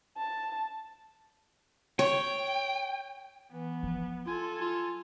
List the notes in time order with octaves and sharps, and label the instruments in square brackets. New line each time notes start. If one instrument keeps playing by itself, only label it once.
[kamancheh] A5
[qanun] C#5 [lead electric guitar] G5
[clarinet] E3 [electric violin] B3
[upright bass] F3 F#3
[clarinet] F4 [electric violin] A4 G#5
[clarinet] F4